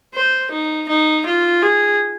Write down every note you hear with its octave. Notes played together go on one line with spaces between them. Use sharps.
C5
D#4
D#4
F4
G#4